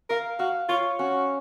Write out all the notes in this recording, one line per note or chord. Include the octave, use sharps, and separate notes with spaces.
A#4 F5
F#4 F5
F4 C#5
C#4 F#4